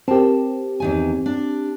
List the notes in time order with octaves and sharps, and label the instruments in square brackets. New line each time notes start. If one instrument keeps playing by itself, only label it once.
[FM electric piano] C4 G4 [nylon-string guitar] A#4 A5
[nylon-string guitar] E2 D#3 G#5
D4